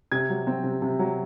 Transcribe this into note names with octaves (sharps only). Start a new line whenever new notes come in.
C3 G#6
F#3
C4
C3
C3
F#3